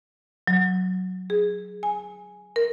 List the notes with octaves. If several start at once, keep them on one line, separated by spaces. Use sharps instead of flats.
F#3
G#4
G#5
A#4